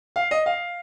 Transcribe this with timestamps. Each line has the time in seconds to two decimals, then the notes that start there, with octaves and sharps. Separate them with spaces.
0.16 F5
0.31 D#5
0.46 F5